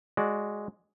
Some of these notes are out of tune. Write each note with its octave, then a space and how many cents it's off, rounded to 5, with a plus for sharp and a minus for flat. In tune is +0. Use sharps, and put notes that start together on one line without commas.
G#3 +0 F#4 +0 D5 +0